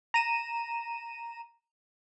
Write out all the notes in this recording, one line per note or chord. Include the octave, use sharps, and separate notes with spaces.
A#5 D#7 E7